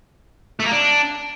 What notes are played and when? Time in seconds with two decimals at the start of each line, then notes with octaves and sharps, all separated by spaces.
0.60 A3
0.66 A#3
0.72 D4